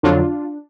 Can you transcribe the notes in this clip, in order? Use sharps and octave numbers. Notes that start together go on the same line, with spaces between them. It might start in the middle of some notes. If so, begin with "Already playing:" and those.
F2 D3 F#3 D4 F4